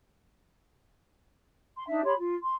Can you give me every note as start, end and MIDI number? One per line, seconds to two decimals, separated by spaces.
1.76 1.86 84
1.87 2.02 62
1.87 2.02 63
1.87 2.02 76
2.05 2.13 67
2.05 2.13 73
2.05 2.13 83
2.05 2.13 84
2.18 2.34 65
2.41 2.54 84